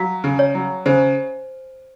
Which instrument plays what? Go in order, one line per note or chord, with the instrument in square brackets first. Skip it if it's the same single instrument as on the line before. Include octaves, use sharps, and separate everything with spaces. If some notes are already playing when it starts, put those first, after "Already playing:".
Already playing: [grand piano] F#3 [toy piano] F5
[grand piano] C#3
[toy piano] C#5
[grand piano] F#3
[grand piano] C#3 [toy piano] C5